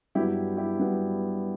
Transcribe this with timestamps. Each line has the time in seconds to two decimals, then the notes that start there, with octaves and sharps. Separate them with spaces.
0.15 G2 F#3 B3 E4 G4
0.57 E4 G4
0.79 G2 F#3 B3